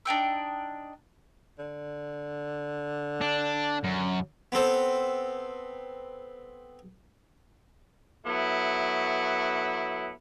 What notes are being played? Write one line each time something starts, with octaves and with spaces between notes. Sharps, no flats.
D4 D#4 G5 E6
D3
D4
F#2
B3 C4 A4 C5
F#3 A3 B3 E4